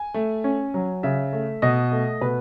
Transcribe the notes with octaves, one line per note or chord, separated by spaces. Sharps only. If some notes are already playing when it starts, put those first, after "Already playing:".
Already playing: G#5
A3
C#4
F#3
C#3 E5
A3
B2 D#5
A3
B2 B4